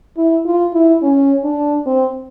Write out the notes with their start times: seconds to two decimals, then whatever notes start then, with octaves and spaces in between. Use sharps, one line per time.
0.17 E4
0.45 F4
0.74 E4
1.02 C#4
1.44 D4
1.86 C4